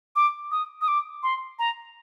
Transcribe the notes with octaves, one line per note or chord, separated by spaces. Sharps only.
D6
D#6
D#6
D6
C6
A#5